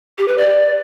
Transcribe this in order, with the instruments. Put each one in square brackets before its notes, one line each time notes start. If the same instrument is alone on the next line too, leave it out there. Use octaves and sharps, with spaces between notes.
[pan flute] G4
B4
D5